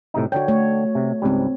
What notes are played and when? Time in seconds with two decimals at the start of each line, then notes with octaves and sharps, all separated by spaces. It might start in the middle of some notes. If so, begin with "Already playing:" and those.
0.14 A2 C3 D#4
0.32 D3 F#4 C#5 G5
0.48 A3 C#5
0.95 C3
1.22 C#2 G#2 G3 A3 C4